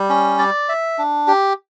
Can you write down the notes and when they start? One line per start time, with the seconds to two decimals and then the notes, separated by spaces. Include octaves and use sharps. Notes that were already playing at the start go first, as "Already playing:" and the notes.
Already playing: G3
0.09 C#4
0.39 D5
0.69 E5
0.98 D4
1.28 G4